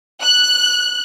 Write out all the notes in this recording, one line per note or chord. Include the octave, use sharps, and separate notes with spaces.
F#6